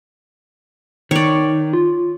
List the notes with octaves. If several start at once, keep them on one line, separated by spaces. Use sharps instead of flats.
D#3 C#5 D5
F4